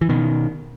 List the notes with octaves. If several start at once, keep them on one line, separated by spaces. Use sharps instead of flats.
E3
B2 D#3